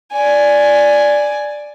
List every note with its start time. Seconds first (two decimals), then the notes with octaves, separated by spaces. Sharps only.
0.12 D5 G#5